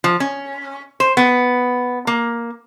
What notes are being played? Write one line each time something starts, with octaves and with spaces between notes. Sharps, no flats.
F3
C#4
C5
B3
A#3